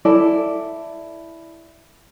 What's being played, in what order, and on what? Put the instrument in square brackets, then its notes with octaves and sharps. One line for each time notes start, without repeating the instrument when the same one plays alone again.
[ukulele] E4 A4 D5